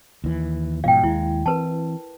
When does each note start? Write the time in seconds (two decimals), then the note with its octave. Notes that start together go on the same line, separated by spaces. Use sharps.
0.24 D#2 E3
0.84 G#2 B2 F3 F5 G5
1.03 D#2 G#3 E4
1.46 E3 C4 A#4 B4 A5